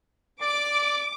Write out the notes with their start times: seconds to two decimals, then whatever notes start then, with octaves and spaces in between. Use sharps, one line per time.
0.42 D5 D6